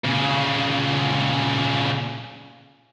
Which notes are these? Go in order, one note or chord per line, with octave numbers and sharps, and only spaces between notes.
A#2 C#3